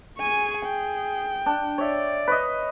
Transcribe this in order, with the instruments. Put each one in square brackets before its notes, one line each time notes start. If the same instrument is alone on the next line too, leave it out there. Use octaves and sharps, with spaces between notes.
[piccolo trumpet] G#4 [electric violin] G#5 C#6
[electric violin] G5
[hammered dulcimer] D4
[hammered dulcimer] C#5 E5 [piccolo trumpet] D5
[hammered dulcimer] B4 C#5 D#5